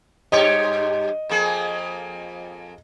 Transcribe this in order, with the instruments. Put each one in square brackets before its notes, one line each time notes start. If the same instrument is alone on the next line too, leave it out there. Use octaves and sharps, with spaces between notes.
[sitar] G2 G4 C#5 [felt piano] D#5
[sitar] F2 A#3 G#4